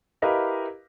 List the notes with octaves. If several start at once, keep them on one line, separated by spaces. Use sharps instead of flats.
E4 G4 A#4 B4 D#5 F5